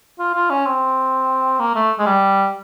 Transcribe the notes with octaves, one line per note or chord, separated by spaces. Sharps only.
F4
F4
C#4
C4
A#3
A3
G#3
G3